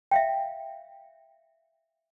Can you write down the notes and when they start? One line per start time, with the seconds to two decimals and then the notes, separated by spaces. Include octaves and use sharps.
0.11 E5 F5 G5